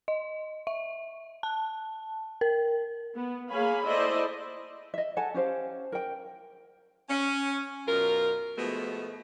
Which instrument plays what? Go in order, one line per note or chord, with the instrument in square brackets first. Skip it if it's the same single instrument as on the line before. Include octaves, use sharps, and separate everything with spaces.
[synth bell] D#5
E5
A5
A#4
[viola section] B3
A#3 G#4 C#5 F5 G#5 B5
E4 A4 C5 D5 D#5
[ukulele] D#5 E5
A4 F#5 G#5 A5
C#4 G4 C5 F5
A#4 G5
[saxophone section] C#4
F#2 B2 F4 A#4
B2 F3 G#3 A3 B3